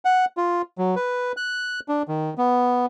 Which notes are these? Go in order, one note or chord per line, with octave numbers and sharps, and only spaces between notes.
F#5
F4
F#3
B4
F#6
D4
D#3
B3